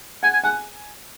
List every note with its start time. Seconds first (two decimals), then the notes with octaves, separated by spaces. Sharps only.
0.23 F#5 G#5
0.33 G#5
0.44 F#5 G#5